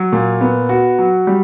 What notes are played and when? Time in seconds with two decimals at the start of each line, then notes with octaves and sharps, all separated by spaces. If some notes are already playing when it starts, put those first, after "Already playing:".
Already playing: F#3
0.13 A#2
0.41 B3
0.69 F#4
0.99 F#3
1.27 G3